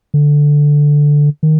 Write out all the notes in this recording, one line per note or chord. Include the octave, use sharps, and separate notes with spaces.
D3
D#3